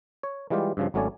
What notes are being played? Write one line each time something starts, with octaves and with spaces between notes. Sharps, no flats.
C#5
E3 G3 G#3 F4 G4
G2 C#3 F3
G#1 F#3 A3 C#4 D5 G#5